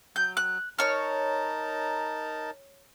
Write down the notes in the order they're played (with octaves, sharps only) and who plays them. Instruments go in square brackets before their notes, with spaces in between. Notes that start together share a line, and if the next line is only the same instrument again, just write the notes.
[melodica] F#3 [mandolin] G6
[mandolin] F#6
[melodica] D#4 A#4 A5 [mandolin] C#5 F6